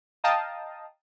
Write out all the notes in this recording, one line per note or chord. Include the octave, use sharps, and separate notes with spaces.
D#5 F5 G5 A5 A#5 D#6